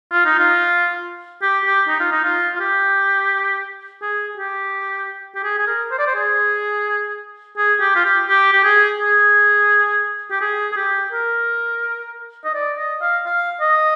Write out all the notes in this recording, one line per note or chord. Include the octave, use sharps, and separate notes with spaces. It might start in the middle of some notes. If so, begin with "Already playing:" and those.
F4
D#4
F4
G4
G4
D#4
F4
D#4
F4
F4
G4
G#4
G4
G4
G#4
G#4
A#4
C5
D5
C5
G#4
G#4
G4
F4
G4
G4
G4
G#4
G#4
G4
G#4
G#4
G4
A#4
D#5
D5
D#5
F5
F5
D#5